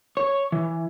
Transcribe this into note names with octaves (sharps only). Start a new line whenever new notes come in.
C#5
E3